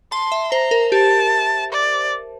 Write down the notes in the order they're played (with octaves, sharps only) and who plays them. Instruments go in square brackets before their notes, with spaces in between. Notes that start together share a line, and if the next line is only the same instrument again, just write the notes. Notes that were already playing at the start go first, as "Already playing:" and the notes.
[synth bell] A5 [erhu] C6
[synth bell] E5
[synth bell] C5 [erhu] A#5
[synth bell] A#4
[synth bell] G4 [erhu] A5
[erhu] D5